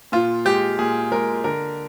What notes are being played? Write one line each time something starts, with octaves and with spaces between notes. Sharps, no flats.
A#2 F4
G#3 G4
A#2 G#4
G#3 A#4
D3 A#4